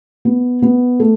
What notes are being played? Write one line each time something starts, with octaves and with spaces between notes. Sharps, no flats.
B3
B3
A3